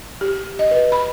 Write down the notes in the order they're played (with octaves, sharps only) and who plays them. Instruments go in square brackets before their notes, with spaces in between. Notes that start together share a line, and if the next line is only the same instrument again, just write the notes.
[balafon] G4
D#5
B4
B5